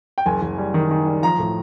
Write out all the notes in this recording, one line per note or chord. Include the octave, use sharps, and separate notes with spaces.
G5
F#1 G#5
F#1
G3
D#3
D#3
G3
F3 A#5
A2